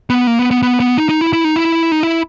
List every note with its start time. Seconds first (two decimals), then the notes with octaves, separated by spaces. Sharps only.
0.10 B3
0.27 A#3
0.39 B3
0.51 B3
0.62 B3
0.80 B3
0.98 D#4
1.09 D#4
1.21 E4
1.33 E4
1.44 D#4
1.56 E4
1.92 D#4
2.03 E4